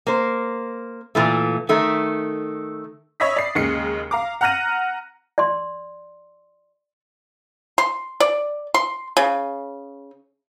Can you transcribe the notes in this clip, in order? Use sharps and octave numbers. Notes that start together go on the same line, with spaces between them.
A#3 C5
A#2 E3 A3
D#3 A3
C#5 D#5 E5 B5 D#6 B6
D5 C7
D#2 C#3 G#3 C7 C#7
F5 A#5 D6
F#5 A#5 F6 F#6 A#6 D#7
D5 C6
C6
D5
C6
C#3